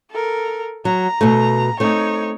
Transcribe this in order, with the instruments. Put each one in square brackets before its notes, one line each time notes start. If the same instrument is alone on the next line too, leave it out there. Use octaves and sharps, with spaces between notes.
[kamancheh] A4 A#4
[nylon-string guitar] F#3 [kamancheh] A#5
[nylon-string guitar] B2 A3
[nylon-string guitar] A3 C4 [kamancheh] D#4 C#5